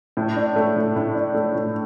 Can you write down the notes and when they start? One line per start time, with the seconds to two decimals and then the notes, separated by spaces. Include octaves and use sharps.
0.17 A2
0.36 D4
0.56 A3
0.76 A2
0.96 A2
1.15 D4
1.34 A3
1.55 A2